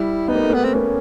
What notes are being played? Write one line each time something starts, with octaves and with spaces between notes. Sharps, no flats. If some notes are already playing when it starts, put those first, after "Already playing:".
Already playing: G3 E4
B3 D#4
A#3
A3
A#3 B3
C4
A#3 C#4